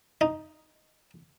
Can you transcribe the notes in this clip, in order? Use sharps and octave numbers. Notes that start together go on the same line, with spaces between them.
D#4